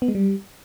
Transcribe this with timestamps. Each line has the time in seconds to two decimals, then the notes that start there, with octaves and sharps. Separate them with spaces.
0.02 B3
0.08 G#3
0.15 G3